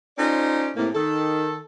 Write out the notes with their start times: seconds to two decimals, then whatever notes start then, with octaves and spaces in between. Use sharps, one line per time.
0.18 C#4 D#4 F4 A4 C5 D5
0.76 A2 C3 A#3
0.94 D#3 A4